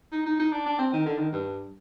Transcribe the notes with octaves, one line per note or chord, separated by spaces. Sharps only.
D#4
D#4
D#4
D4
D4
C4
D#3
D3
D#3
G2